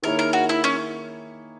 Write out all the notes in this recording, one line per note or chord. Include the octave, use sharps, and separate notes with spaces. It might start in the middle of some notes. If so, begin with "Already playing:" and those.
D#3 A#3 E4 G#4 A#4 C#5
A#4
F#4
E4
C#4